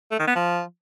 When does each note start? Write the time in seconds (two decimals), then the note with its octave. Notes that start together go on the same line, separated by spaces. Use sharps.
0.12 A3
0.19 D#3
0.27 B3
0.35 F3